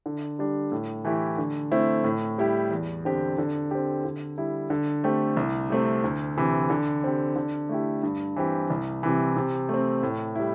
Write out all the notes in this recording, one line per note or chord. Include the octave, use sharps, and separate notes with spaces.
D3
G3 D4
A2
E3 A3 E4 G4
D3
A3 C4 E4
A2
G3 E4 G4
E2
D3 C4 G4
D3
C4 G4
D3
G3 E4
D3
A3 C4 G4
C2
C3 A3 C4
D2
C3 E3
D3
C4 G4
D3
A3 E4 G4
G2
E3 C4 G4
C2
C3 E3
C3
A3 C4
A2
G3 E4